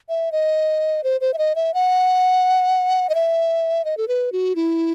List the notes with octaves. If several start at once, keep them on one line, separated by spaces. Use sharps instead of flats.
E5
D#5
C5
C5
E5
D#5
E5
F#5
D#5
E5
D#5
A4
B4
F#4
E4